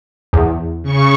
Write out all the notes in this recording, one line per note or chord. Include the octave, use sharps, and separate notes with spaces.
E2
C#3 C#6